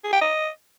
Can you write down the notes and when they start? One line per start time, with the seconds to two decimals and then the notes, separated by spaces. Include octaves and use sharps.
0.04 G#4
0.13 G5
0.21 D#5